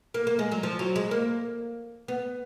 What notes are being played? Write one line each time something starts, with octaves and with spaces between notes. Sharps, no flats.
A#3
A#3
G#3
F#3
F3
F#3
G#3
A#3
B3